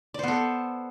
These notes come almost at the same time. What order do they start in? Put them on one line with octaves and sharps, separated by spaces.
D5 C5 B3 A4